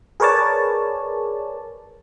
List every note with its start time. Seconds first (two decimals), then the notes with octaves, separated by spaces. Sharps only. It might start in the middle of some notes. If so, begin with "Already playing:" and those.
0.20 G#4 A#4 B4 C#5 D5 A5